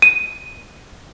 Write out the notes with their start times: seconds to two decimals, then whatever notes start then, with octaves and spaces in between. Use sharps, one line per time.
0.02 D#7